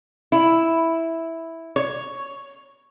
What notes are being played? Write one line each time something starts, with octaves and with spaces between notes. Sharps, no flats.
E4
C#5